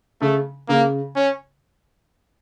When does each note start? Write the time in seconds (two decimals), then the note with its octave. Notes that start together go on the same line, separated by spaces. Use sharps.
0.21 C#3 A3
0.69 C#3 A#3
1.16 C#4